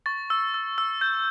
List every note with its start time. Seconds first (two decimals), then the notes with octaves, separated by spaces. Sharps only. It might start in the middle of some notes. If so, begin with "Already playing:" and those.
0.06 C#6 A6
0.30 E6
0.54 E6
0.78 E6
1.01 G6